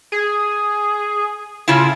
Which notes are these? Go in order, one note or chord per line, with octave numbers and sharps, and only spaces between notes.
G#4
A2 C#3 E4 F4